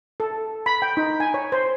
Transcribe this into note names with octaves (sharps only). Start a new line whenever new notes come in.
A4
B5
G5
D#4
G#5
C#5
C5